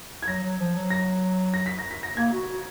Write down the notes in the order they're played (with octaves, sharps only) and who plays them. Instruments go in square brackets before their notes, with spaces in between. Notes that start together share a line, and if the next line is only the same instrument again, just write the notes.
[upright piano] G#6
[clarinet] F#3 [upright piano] A#6
[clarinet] F#3
F3
F#3
[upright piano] A#6
A#6
B6
A#6
B6
A#6
[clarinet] A#3 [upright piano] G#6
[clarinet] F#4
F#4